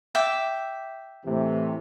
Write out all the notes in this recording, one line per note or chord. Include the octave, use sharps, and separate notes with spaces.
E5 G5 D6
A2 C3 E3